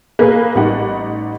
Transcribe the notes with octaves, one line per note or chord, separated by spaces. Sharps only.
A#3 G#4 B4 F5
A1 G3 D#4 F#5